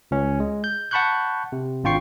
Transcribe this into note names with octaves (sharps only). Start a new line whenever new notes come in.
C#2 C#4
G#3
G6
F#5 A5 B5 C#6 F#6 G6
C3
G#1 D4 F4 G5 C#6 C7